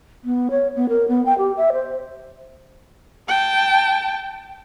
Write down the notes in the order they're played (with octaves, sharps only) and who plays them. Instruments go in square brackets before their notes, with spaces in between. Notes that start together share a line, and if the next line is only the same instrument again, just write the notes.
[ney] B3
C#5
B3
A#4
B3
G5
G4
E5
C5
[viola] G5 A5